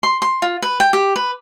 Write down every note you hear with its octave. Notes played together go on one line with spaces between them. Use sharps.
C6
C6
F4
B4
G5
G4
B4